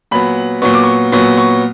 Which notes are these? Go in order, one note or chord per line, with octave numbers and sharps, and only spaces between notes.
A#2 F#3 B3 B5
A#2 F#3 B3 C#6
D6
C#6
A#2 F#3 B3 C#6
C#6